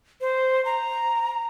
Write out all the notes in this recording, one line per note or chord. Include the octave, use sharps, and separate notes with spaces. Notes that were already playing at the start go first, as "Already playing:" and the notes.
C5
A#5